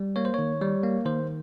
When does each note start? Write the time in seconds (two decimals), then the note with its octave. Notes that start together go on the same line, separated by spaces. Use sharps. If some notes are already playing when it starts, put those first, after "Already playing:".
Already playing: G3
0.16 A#3 C#5
0.25 C5
0.34 D#3 C#5
0.61 G3
0.83 A#3
1.06 D#3 C5